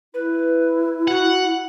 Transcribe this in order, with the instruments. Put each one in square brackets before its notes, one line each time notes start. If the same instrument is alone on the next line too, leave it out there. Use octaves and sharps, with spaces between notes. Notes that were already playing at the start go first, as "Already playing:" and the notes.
[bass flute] E4 [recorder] B4
[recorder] F#4 [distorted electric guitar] F#5